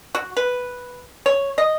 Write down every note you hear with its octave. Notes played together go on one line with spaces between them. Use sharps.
F#4
B4
C#5
D#5